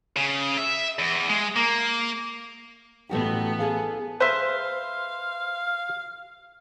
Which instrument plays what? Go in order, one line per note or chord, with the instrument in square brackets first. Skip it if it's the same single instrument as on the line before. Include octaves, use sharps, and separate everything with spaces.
[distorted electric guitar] C#3
E5
E2
G#3
A#3
[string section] A1 B3 [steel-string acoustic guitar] A3 F#4 G4
[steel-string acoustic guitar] G#4 A4 F5
[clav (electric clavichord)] B4 E5 [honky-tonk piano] C5 [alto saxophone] F5